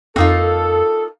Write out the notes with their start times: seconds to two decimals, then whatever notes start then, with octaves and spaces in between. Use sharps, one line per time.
0.16 F2 A#3 D#4 F4 A4